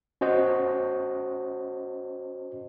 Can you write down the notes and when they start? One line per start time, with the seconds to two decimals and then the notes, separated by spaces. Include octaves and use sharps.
0.21 C#4 F#4 C5 D#5 F#5